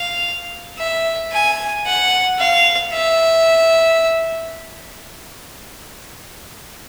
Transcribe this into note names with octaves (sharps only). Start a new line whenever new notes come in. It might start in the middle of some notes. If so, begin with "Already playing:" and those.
Already playing: F5
E5
G#5
F#5
F5
E5